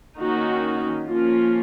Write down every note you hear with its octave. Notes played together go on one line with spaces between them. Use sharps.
D#3 A#3 C#4 D#4 F#4
F3 A#3 C#4 F4